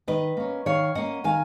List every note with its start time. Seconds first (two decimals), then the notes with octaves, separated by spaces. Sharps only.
0.07 D#3 B4 D#5
0.37 A#3 C#4
0.66 D#3 C#5 F5
0.95 A#3 C#4 D#5 F#5
1.24 D#3 F5 G#5